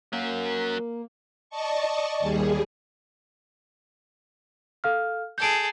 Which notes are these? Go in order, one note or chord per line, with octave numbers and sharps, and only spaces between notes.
F#3 A#3 C#4
D5 D#5 A5 C#6
D#2 G3 G#4
A4 F5 F6
G#4 A4 G6 D7